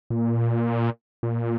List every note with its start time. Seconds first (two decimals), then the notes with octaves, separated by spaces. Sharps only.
0.10 A#2
1.23 A#2